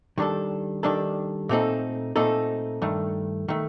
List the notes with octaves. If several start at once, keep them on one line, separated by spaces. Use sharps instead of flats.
D#3 G3 D4 A4
D#3 G3 D4 A4
A#2 A3 C4 D#4 A4
A#2 A3 C4 D#4 A4
G2 D#3 A3
D#3 A3